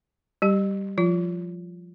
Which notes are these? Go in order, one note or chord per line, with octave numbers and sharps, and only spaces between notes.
G3 G4
F3 F4